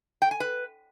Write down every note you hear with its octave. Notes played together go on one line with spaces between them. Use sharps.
G5
G#5
B4